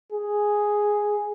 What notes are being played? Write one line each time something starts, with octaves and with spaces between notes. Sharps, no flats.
G#4